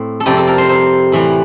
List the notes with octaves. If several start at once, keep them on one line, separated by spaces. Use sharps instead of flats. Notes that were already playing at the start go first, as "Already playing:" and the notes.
Already playing: A2 C4
A4
F2 C3 G3 G4
A4
A#4
C5
C5
A2 E3 G3